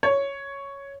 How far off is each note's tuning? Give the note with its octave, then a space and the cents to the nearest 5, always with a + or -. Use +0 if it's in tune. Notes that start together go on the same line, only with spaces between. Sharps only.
C#5 +5